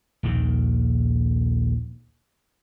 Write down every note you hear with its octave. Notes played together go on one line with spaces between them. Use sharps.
A#1 D#2 D#3